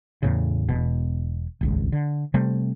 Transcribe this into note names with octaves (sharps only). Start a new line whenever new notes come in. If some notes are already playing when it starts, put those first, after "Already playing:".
E2 A2 C#3
E1 B2
D#1 G#1 C#2
D3
C3 G3 A3 C4